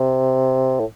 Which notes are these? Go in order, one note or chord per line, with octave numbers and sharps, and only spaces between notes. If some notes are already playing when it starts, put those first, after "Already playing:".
Already playing: C3
A2